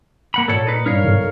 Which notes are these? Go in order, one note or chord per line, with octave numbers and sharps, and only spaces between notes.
A#3 F#5 B5
A#2 A4 C#5 C#7
D#4 B4
G2 A#4 C#5 F5
B1